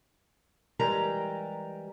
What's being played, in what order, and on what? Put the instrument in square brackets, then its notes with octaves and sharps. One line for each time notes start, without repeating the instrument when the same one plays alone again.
[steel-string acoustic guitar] E3 G3 G#3 G4 A#4 A#5